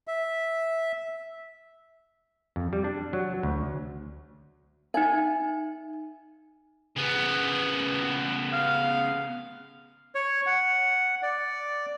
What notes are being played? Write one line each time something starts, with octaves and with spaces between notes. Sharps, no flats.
E5
F2
G3
D4
F#3
D2
D#4 E5 G#5
C#3 B3
F5
C#5
F#5
D5